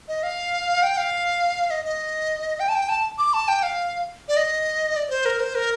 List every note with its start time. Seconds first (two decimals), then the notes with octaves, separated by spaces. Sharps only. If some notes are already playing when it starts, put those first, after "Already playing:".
0.08 D#5
0.23 F5
0.83 G5
0.97 F5
1.70 D#5
1.85 D#5
2.60 G5
2.69 A5
2.75 G5
2.89 A5
3.18 D6
3.34 A5
3.48 G5
3.63 F5
4.28 D5
4.37 D#5
4.96 D5
5.07 D5
5.10 C5
5.25 A#4
5.40 C5
5.55 A#4